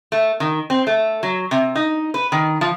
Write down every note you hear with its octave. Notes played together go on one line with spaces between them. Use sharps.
A3
D#3
C4
A3
F#3
C3
D#4
B4
D#3
F3